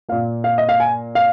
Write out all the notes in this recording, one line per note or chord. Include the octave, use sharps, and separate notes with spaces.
A#2 A#3 F5
F5
D#5
F5
G#5
F5